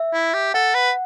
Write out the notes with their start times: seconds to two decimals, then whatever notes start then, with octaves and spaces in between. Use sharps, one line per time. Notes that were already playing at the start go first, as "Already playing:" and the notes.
Already playing: E5
0.13 E4
0.34 G4
0.54 A4 F#5
0.74 B4